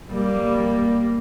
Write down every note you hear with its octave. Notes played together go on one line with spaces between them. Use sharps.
G3 A#3